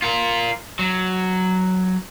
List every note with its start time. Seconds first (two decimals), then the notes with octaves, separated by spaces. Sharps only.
0.02 F4 A#4
0.79 F#3